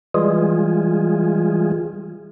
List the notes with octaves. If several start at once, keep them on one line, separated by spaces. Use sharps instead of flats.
E3 G3 G#3 F4 G#4